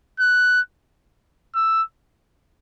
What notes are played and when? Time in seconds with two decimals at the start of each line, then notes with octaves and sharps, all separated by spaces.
0.20 F#6
1.55 E6